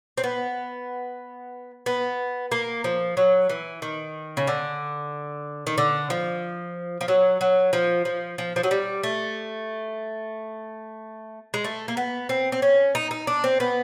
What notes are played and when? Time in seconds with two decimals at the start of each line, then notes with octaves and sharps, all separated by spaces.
0.18 C4
0.24 B3
1.86 B3
2.52 A#3
2.84 F3
3.17 F#3
3.50 E3
3.82 D#3
4.37 C#3
4.47 D3
5.67 D#3
5.78 D3
6.10 F3
7.01 F3
7.08 F#3
7.41 F#3
7.73 F3
8.05 F3
8.38 F3
8.56 F3
8.63 F#3
8.71 G3
9.04 A3
11.54 G#3
11.65 A3
11.88 A#3
11.97 B3
12.29 C4
12.52 C4
12.62 C#4
12.95 D#4
13.11 D#4
13.27 D4
13.44 C4
13.60 B3